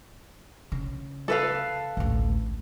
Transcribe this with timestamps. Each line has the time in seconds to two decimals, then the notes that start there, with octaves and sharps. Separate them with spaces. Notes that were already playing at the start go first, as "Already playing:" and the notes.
0.72 C#3
1.28 A4 B4 F5
1.97 A1 D2